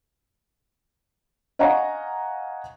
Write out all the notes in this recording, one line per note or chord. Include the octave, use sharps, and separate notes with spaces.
D#5 F5 F#5 G#5 A#5 C#6